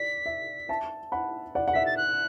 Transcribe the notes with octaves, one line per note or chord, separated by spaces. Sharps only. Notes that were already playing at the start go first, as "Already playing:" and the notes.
Already playing: D5 B6
E5
E5 A5
F#5 B5
D5 F#5
F#5
E5 B6
A6
F#6